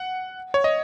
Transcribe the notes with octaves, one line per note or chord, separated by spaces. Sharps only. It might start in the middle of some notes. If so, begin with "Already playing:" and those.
Already playing: F#5
C#5
D#5